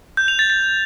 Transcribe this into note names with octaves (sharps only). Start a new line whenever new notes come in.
G6
F7
A6
A6